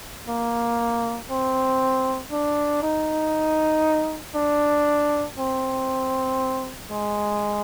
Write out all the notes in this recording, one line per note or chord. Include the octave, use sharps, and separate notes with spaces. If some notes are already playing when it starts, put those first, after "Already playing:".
A#3
C4
D4
D#4
D4
C4
G#3